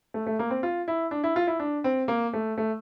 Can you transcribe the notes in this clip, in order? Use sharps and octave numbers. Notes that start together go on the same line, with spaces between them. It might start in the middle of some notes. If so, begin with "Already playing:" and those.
A3
A3
A#3
C4
F4
E4
D4
E4
F4
E4
D4
C4
A#3
A3
A3